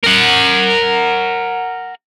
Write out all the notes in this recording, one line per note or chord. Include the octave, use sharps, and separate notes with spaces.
A#4 F#5